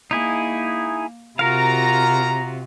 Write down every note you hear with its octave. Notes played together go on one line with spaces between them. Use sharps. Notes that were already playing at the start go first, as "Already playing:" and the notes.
A#3 D#4 E4 G#4
C3 F4 F#4 A#4 F5 A#5